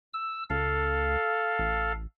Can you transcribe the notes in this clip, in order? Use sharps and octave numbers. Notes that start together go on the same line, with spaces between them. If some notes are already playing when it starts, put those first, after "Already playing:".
E6
C#2 A4 F5
A1